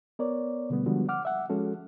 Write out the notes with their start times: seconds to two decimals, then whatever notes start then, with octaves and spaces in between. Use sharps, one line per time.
0.19 B3 A#4 C#5 D5
0.70 B2 D3 G3 A3 B3
0.86 D3 F3 G3 G#3 B3 F#4
1.09 F#5 D6 F6
1.25 E5 F#5
1.50 F3 G#3 C#4 F#4 A4